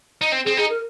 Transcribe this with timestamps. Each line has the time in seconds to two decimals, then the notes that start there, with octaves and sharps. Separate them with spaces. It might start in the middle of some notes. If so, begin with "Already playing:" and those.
0.21 D#4
0.32 C4
0.45 C4 G#4
0.57 D#4 G#4
0.70 A#4